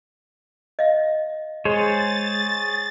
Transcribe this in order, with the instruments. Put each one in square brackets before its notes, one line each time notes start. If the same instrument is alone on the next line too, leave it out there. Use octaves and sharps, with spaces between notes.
[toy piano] D#5 F5
[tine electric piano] G#3 [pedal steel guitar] G#4 C5 C#5 [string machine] A6